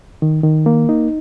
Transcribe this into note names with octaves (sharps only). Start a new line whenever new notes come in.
D#3
D#3
A#3
D#4